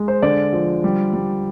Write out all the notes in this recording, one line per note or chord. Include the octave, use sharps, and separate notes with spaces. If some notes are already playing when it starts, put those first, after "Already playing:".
Already playing: G#3
C5
D3 D5
F3
G3
G3